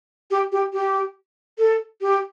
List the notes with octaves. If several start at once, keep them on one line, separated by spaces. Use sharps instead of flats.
G4
G4
G4
A4
G4